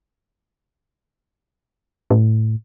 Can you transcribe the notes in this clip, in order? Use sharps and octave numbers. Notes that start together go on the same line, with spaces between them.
A2